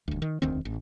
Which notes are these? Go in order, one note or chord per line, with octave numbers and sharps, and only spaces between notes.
D#1 D2
D#3
E1 D2 D#3 C4
A1